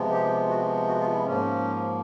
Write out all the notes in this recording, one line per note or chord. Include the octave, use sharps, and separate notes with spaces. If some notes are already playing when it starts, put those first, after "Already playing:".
Already playing: C3 F3 G#3 B3
G4
F#4
F#4
F4
E4
G#2 F3 A#3 C#4